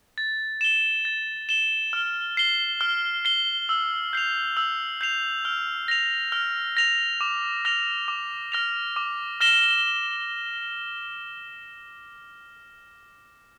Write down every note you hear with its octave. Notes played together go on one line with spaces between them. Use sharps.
A6
E7 G7
A6
E7 G7
F6
C7 G7
F6
C7 G7
E6
G6 C7 F7
E6
G6 C7 F7
F6
A#6 F7
F6
A#6 F7
D6
F6 A#6 F7
D6
F6 A#6 F7
D6
F6 A#6 E7 G7